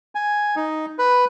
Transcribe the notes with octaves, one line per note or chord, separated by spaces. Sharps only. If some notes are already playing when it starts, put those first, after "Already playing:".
G#5
D#4
B4